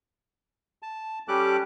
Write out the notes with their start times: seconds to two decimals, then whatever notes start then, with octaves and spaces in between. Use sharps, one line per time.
0.82 A5
1.28 G3 C#4 G4 A4 D6 F#6